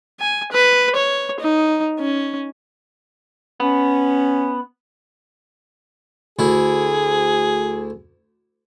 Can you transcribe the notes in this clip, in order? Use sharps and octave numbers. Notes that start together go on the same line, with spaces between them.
G#5
B4
C#5
D#4
C#4
B3 C#4
D2 E4 G#4